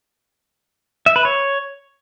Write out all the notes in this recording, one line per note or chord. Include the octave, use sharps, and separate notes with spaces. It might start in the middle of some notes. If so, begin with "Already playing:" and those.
E5
B4
C#5